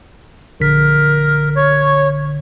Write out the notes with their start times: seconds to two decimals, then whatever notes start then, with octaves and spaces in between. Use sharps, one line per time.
0.60 A#1 D3 A#4 B6
1.55 C#5